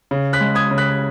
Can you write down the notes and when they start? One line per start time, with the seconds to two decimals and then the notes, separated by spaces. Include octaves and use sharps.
0.11 C#3
0.33 F#6 B6
0.41 G#3
0.55 D#6 G#6
0.71 C#3
0.78 F#6 B6